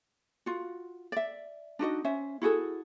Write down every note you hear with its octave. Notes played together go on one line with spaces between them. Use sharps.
F4 F#4
D5 E5
D4 D#4 F#4 D#5
C#4 C5 E5
E4 F#4 G#4 A4